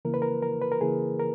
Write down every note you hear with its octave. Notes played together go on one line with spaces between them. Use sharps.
C#3 E3 A#3 E4 A#4
B4
A#4
A#4
B4
A#4
C#3 E3 A#3 E4 G#4
A#4